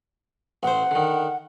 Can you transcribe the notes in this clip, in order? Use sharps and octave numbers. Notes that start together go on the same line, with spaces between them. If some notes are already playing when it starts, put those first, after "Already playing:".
A1 C5 F#5
D3 D#3